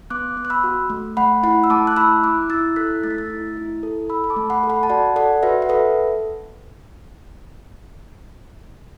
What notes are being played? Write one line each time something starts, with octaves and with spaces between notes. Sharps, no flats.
B3 D6 F#6
B3
F#6
B5 E6
F#4
A3
A3 F#5 B5
E4 F#5 B5
E6
A3 A5 D6
F#6
E4 B5 E6
E4 D6 F#6
E4 E6 A6
A4 F#6 B6
A3 A6
B6
E6 A6
E4
E4
A4
A4 B5 E6
B5
A5 D6
A3
F#5 B5
A4
F#5 B5
A5
F#4 D5 F#5
A4 D5 F#5
F#4 B4 E5
F#5
A4 B4 E5